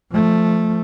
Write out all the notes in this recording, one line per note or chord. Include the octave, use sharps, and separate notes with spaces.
F3 A3